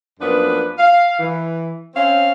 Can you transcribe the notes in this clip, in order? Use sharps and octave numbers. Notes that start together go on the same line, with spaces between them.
F#2 F3 A#3 B3 D4 B4
F5
E3
C4 C#4 F5